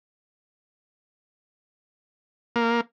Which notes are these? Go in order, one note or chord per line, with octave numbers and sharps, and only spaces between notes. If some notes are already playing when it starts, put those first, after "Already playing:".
A#3